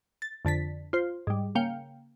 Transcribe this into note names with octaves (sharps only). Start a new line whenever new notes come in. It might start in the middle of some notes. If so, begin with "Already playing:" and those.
A6
F2 D3 A6 B6
F4 C5
G#2 G3
C#3 A#3 F5 G5 C#7